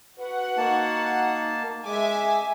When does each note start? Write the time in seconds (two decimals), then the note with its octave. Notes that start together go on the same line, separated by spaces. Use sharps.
0.19 F#4 B4 F#5
0.57 A#3 D#4 A5
1.85 G#3 E5 G#5 D6